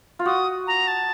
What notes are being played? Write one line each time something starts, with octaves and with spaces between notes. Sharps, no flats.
F4
F#4 D#6
A#5
A5